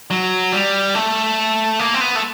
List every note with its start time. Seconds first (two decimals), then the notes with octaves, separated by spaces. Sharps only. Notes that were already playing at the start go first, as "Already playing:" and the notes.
0.10 F#3
0.52 G3
0.95 A3
1.79 A#3
1.94 C4
2.01 B3
2.15 A3